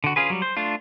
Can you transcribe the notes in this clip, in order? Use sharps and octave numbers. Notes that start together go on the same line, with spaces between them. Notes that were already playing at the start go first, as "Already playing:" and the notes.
D3 F#4
C#4 F4 G#4 B4
F#3 G3
C5
A3 D4 F4